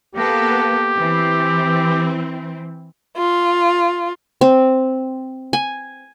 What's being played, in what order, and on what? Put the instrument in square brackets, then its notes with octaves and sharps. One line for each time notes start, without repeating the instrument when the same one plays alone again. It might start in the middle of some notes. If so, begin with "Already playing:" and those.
[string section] A#3 B3 A4 [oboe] G4
[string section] E3 C4
[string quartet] F4
[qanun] C4
G#5